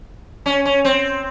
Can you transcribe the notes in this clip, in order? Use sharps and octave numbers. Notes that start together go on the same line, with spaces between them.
C#4
C#4
C4